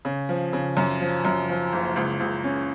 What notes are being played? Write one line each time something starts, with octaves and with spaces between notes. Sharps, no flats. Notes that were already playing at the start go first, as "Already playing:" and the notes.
C#3
F3
C#3
F#2
F3
F#2
F3
F#1
C#2
C#2
C#4